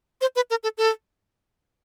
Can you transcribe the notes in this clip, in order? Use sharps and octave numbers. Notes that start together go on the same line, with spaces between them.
C5
B4
A#4
A4
A4